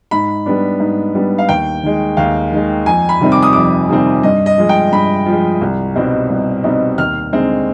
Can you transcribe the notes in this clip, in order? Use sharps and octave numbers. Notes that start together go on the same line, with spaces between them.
G#2 B5
G3 B3 D4
G#2
G3 B3 D4
F5
D#2 G5
D#3 G#3
D#2 F5
D#3 G#3
F2 G#5
B5
C3 D#3 G3 C4
D6
D#6
F2 D6
C3 D#3 G3 C4
G2 D#5
D#5
F3 G#3
G5
G2 B5
F3 G#3
C2
B2 G3 C4 D#4
C2
B2 G3 C4 D#4
D#2 F6
D3 G#3 C4 D#4